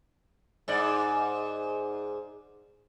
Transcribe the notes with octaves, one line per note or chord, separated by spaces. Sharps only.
G#2 D#4 D5